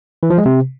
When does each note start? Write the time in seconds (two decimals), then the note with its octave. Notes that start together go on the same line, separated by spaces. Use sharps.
0.23 E3
0.30 F3
0.38 G#3
0.46 C3